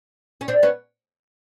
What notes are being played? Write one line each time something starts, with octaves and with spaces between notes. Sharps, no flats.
C#4
C4 D4
B3 C#4